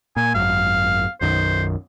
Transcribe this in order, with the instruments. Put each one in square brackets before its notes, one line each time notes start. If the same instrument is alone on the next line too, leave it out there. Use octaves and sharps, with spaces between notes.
[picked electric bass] A#2 [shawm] G#5
[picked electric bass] G#1 F#2 [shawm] F5
[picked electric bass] B1 F#2 D#3 [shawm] C5